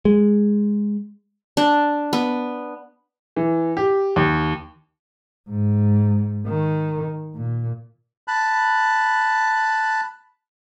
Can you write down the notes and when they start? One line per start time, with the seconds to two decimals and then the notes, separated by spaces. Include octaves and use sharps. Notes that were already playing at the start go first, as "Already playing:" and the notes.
0.05 G#3
1.57 D4
2.13 B3
3.36 E3
3.77 G4
4.16 D#2
5.50 G#2
6.47 D#3
7.34 A#2
8.28 A5 B5 F#6